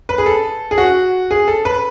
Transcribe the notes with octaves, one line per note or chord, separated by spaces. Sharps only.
B4
G#4
A4
G#4
F#4
G#4
A4
B4